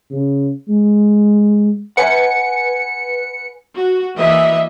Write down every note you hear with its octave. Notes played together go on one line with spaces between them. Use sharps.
C#3
G#3
B4 F#5 G#5 C#7
F#4
E3 A#3 D#5 E5